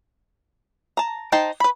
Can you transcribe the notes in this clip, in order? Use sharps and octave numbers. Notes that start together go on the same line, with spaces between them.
A5 A#5
D#4 C5 G5 A5
B4 B5